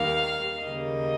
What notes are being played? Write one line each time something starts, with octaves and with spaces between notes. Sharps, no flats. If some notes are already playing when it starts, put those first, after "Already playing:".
Already playing: D#2 D#3 G3 A#3 F5
D#2 C#3 G3 A#3 D#5